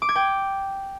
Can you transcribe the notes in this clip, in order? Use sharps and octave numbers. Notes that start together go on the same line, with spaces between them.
D6
G#6
G5